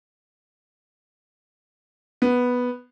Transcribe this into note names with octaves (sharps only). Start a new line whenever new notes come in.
B3